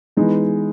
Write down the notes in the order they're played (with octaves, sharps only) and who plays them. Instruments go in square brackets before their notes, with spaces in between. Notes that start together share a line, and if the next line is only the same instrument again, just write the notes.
[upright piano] E3 G#3 B3 D#4